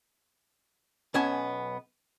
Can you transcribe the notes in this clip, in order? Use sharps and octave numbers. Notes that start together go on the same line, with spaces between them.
B1 B3 C#4 G#5 A5